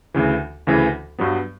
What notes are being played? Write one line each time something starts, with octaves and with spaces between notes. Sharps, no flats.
D2 C#3 E3
D2 C#3 E3
G2 F#3 B3